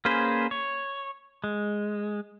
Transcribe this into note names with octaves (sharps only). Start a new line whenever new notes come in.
A#3 C#4 G#4 B4 C5
C#5
G#3